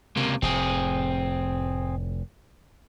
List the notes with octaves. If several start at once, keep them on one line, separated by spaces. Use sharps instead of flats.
C#2 C3 A#3
F1 F2 A2 C4 G#4